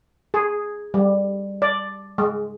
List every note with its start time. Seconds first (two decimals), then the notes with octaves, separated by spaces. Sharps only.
0.34 G#4
0.94 G3
1.62 D5
2.18 G#3